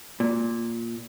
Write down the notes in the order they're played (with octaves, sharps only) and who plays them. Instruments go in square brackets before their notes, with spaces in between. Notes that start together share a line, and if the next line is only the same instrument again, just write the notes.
[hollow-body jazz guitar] A#2